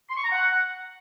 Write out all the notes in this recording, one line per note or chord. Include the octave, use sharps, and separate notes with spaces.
C6
C#6
A#5
F#5